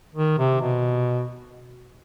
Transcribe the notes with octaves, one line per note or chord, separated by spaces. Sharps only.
D#3
C3
B2